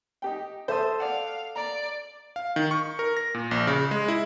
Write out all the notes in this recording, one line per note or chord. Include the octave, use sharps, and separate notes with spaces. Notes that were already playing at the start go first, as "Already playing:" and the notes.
D#4 G4 G5
A4 C5 E5 C6 D#6
D5 F5 F#5
D5 A#5
F5
D#3
C#6
A#4
A#6
A#2
A#1
C#3
G#3
E4